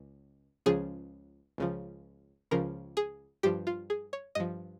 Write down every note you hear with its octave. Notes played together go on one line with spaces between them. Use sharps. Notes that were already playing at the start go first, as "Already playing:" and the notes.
Already playing: C#2
C#2 C#3 F3 G#4
C#2 C#3 F3
C#2 C#3 F3 A#4
G#4
G2 F3 G4
F4
G#4
C#5
G2 F3 D#5